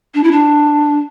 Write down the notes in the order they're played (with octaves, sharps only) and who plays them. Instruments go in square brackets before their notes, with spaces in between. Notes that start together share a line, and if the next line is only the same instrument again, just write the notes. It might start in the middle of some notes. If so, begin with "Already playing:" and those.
[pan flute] D4
E4
D4